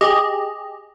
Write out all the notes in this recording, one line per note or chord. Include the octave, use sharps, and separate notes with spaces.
G4 G#4 D#5